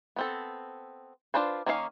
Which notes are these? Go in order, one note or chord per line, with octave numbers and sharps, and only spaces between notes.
B3 C4 A4
D4 F4 B4 C5
D#3 A#3 C#4 D#4 F5